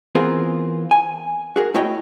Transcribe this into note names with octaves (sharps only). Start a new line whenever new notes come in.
E3 B3 C4 F4 G#4 A#4
G#5
F#4 G#4 A#4
A3 E4 F#4 C#5 D#5 G5